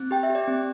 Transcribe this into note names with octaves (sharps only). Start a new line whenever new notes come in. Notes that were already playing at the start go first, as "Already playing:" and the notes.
Already playing: C4
G4 G5
E5
G4
D5
C4